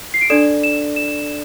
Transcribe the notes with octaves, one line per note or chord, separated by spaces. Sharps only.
C7
D7
D4 A4 D5 E7
E7
E7